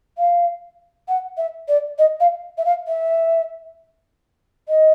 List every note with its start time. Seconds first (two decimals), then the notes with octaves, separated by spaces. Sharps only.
0.18 F5
1.08 F#5
1.37 E5
1.68 D5
1.98 D#5
2.20 F5
2.58 E5
2.65 F5
2.88 E5
4.69 D#5